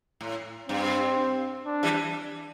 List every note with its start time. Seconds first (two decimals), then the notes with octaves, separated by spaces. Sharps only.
0.21 A2
0.69 G2 C4
1.67 D4
1.83 E3 G3